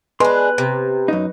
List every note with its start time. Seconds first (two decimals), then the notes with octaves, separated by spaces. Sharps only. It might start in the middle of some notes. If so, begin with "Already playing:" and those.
0.20 G#3 D4 B4 C6
0.58 C3
1.08 F#2 D#4